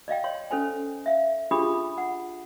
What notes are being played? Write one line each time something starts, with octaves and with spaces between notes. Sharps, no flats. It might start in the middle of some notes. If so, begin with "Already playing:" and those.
D5 D#5 F5 G5
C#5 C6
C#4 A4 C5 G#5
E5 F5
D4 F4 G4 G#4 B5 D#6
F#5